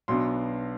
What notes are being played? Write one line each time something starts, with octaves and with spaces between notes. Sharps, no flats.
B1 B2 B3 D4 C6